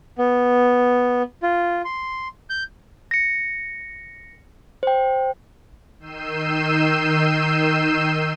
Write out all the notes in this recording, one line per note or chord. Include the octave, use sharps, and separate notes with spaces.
B3
F4
C6
G6
A#6 C#7
C5 G5
D#3 E6 G6 C7 D#7 E7